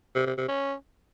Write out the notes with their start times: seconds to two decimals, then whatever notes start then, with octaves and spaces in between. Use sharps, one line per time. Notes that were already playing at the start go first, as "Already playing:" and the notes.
0.15 C3
0.26 C3
0.37 C3
0.48 C#4